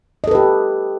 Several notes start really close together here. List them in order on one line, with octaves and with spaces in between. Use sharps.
D#5 A4 B4 G4